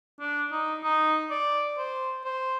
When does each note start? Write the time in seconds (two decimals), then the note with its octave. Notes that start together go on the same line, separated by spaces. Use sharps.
0.20 D4
0.51 D#4
0.83 D#4
1.31 D5
1.78 C5
2.25 C5